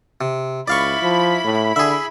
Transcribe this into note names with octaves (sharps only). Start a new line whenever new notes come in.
C3
C#2 E4 D5 F5 B5 C#6
F3
A2
D3 G#4 E5